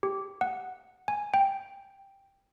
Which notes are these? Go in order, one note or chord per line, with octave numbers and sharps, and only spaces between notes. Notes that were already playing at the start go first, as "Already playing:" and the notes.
G4
F#5
G#5
G5